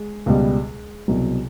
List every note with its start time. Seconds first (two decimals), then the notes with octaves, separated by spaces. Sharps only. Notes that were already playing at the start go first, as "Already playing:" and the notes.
Already playing: G#3
0.26 C#2 B2 G3
1.08 C2 B2 F#3